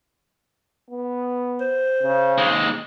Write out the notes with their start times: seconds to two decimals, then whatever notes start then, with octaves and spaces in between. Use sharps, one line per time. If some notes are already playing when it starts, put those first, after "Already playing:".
0.91 B3
1.60 C5
2.03 C#3
2.38 D#2 G#3